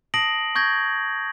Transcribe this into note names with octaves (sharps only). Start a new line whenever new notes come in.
A5 D#6 A#6 C7 D7 F#7
C#6 G6 G#6 A#6